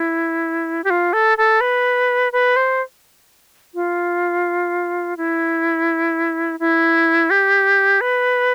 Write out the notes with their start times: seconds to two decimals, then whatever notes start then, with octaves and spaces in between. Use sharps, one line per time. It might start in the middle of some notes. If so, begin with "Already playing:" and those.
Already playing: E4
0.84 G4
0.90 F4
1.13 A4
1.38 A4
1.61 B4
2.33 B4
2.56 C5
3.75 F4
5.17 E4
6.60 E4
7.30 G4
8.01 B4